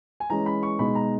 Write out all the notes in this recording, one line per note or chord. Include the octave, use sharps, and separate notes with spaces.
G#5
E3 G#3 C#4 A#5
B5
C#6
B2 G#3 B3 D#4 B5
A#5